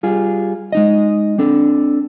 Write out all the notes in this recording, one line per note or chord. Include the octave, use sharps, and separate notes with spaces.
G3 F4 G#4
G#3 D#4 D#5
C4 D4 A4